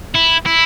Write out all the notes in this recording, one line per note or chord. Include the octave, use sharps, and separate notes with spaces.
E4
E4